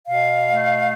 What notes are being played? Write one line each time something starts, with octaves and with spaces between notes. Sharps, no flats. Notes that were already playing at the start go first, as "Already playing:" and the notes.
B2 F5
A3